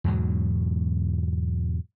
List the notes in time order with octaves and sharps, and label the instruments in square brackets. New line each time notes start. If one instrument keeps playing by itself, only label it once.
[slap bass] E2 G#2 B2 F#3